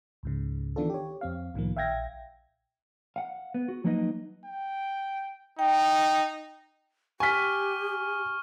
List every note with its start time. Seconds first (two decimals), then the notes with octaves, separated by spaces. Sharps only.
0.23 C#2 G#2 C#3
0.76 D#3 E3 B3 D4 F4 A4
0.90 G4 C#5
1.21 F2 C4 F5
1.54 C2 A2 D#3 F3 A#3
1.76 A#1 E5 F5 G5 G#6 A#6
3.16 F5 F#5
3.54 B3
3.68 F#4
3.84 F3 F#3 A#3 D#4 B4 D#5
4.45 G5
5.59 D#4 G5
7.20 G4 G#5 C#6 F6 B6